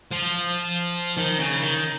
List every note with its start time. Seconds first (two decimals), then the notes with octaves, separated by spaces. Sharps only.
0.11 F3
1.17 D#3
1.39 C#3
1.60 D#3